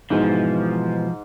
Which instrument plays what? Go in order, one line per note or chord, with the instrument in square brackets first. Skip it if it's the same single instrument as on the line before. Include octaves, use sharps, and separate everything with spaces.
[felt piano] G#2 [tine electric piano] B2 E3 G#3 [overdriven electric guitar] F3